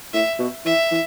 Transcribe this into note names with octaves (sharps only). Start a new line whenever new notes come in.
A2 E5
B2
E3 E5
E3